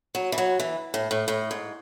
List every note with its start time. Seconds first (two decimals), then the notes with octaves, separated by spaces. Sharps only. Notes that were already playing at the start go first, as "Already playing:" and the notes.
0.15 F#3
0.32 E3
0.38 F#3
0.60 E3
0.94 A2
1.11 A2
1.28 A2
1.51 G#2